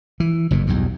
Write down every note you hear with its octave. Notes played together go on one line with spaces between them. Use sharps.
E3
F#1 G2 A#2
B1 E2 G2